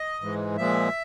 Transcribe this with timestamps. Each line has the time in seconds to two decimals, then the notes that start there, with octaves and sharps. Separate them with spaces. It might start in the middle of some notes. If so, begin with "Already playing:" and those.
Already playing: D#5
0.21 G#2 E3 G#3
0.57 A#2 F3 G#3 E5